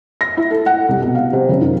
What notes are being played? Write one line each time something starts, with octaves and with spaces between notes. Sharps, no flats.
A#6
E4
A4
F#5
C2
B2
F5
C3
F#1
D#3